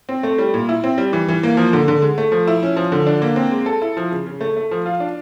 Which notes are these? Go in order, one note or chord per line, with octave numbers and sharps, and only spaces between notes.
C4
A3
G3
A#2
E4
C4
G3
E3
E3
A#3
F3
D3
D3
G#3
A3
F3
E4
C#4
F3
D3
D4
A#3
C4
G#3
A4
E4
F3
C#3
C#3
A3
A3
F3
F4
D4